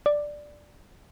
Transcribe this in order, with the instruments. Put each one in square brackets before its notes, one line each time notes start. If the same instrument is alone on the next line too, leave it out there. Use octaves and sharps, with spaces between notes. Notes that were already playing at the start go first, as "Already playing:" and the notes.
[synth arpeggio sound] D5